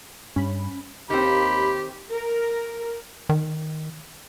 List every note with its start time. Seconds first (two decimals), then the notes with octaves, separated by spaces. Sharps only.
0.36 G2 C#4 B5
1.10 D#2 D#3 C4 G4 B5
2.12 A#4
3.29 D#3